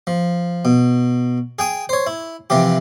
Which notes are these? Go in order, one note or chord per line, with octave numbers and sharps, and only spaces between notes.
F3
B2
G#4 G5 D#6
C5 C#5
E4
C3 E3 F3 G4